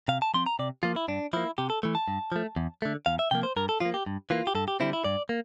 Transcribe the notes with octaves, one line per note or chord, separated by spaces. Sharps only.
C3 F5
A5
F3 C4 C6
A#5
C3 D5
F3 A#3 F4
E4
G2 D4
F3 A#3 E4
C3 G4
A4
E3 A3
A5
G2
F3 A3
E2
D3 A3
E2 F5
E5
C3 F3 A#3 G5
C5
G2 A#4
A4
F3 A#3 F4
G4
G2
E3 A#3 F4
G4
G2 A4
G4
D3 G3 C4 E4
E4
G2 D5
A#3